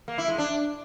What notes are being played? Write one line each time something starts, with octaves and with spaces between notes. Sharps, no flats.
A#3
E4
G#3
D4